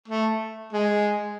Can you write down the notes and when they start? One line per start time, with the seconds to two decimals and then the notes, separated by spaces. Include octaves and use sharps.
0.08 A3
0.73 G#3